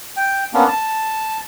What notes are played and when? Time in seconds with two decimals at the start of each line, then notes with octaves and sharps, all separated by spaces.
0.16 G5
0.54 A#3 B3 C#4 D4
0.68 A5